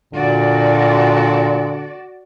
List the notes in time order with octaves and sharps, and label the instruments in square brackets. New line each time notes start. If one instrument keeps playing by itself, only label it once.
[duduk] A#2 [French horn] D3 [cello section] F#4 D5